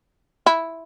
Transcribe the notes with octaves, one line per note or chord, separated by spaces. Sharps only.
E4